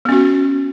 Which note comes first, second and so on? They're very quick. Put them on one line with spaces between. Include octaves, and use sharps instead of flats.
B3 C#4 F#4